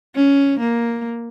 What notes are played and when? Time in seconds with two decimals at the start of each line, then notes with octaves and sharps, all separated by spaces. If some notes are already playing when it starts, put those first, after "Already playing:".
0.15 C#4
0.59 A#3